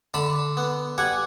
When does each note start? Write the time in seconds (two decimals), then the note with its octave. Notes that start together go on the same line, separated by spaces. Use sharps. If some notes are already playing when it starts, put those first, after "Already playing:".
0.14 D3 A5 B5
0.57 B3
0.98 G3 F#5 G#5